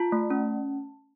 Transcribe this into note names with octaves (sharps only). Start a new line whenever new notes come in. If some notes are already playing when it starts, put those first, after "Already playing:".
Already playing: F4 A5
A3
C#4